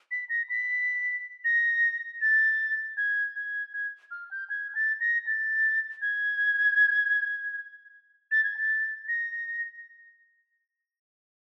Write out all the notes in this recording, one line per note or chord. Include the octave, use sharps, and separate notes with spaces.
B6
A#6
B6
A#6
A6
G#6
G#6
G#6
F6
G6
G#6
A6
A#6
A6
G#6
A6
G#6
A6
A#6